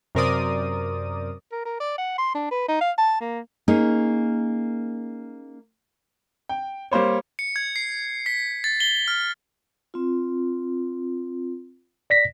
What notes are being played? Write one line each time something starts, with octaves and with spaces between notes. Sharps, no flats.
F#2 C3 A#4 C5 D5 D#6
A#4
A#4
D5
F#5
C6
D4
B4
D#4
F5
A5
A#3
A#3 C#4 D#4 G#4
G5
G3 A#3 C5 C#5
C#7
G#6
C7
B6
A6
G7
F6
C4 F4
D5 A#6 B6